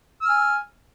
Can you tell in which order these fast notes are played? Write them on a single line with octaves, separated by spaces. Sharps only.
E6 F6 G#5